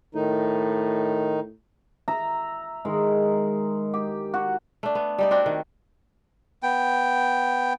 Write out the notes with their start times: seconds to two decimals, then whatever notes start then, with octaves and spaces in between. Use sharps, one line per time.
0.15 A2 D#3 D#4
2.08 E5 A#5
2.85 D#3 G#3
3.94 G4
4.34 F#4
4.83 A3 D4
4.95 B3
5.18 G3 D#4 D5
5.31 C4 D4 F#4 G4
5.46 D#3
6.63 B3 G5